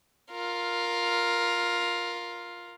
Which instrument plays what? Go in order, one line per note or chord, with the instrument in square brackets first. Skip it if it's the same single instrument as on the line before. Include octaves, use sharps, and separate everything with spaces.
[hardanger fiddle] F4 A#4